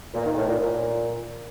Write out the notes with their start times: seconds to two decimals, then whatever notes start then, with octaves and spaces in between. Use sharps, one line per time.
0.14 A#2
0.25 D#3
0.36 A2
0.48 A#2
0.59 A#2